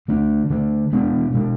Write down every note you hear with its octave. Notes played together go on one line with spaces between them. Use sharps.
D3 A3 D4
D3 A3 D4
B2 G#3 B3 D4
B2 G#3 B3 D4